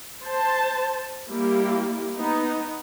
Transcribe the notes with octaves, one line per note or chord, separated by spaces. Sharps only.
C5 A5
G3 A#3 E4 G4
B3 D#4